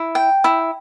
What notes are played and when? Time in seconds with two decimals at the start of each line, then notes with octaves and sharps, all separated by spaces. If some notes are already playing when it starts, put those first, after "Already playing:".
Already playing: E4
0.15 G5
0.44 E4